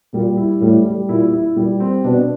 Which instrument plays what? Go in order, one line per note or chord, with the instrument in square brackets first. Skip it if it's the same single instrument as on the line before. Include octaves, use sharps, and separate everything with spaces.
[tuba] A#2 [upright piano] G3
[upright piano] E4
[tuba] A2 [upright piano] G3
[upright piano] G3
[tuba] A#2 [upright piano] E4
[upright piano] E4
[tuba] A#2 [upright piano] G3
[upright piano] C4
[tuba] B2 [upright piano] D4